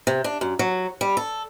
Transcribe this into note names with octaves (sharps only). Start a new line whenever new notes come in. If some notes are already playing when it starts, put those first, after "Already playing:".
C3
D4
F#2
F#3
G3
A4